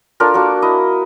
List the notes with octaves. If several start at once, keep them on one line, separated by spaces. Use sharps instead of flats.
D4 F4 A4 A#4
A#3 D4 F#4
E4 D#5